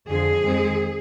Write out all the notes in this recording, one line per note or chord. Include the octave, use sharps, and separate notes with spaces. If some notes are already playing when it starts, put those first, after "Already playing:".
F2 D3 F3 G#4
F2 D#3 G#3 C4